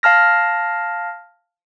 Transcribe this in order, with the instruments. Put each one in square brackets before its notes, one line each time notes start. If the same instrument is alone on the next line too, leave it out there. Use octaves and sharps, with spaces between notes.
[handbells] F5 A5 F6 A#6